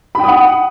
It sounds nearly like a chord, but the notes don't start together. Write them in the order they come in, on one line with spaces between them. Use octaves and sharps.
B5 G5 D#6 F#5